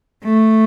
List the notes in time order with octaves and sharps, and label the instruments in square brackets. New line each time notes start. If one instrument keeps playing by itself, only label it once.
[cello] A3